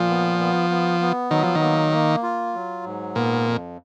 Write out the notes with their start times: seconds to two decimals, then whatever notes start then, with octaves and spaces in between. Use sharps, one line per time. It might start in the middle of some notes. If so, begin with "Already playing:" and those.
Already playing: A#2 F3
0.09 B3
0.39 B3
0.70 B3
1.00 B3
1.31 D#3 F#3
1.43 F3
1.55 D#3
1.62 A#3
1.92 A#3
2.23 F4
2.54 F#3
2.84 G#2
3.15 A#2 B3
3.45 F2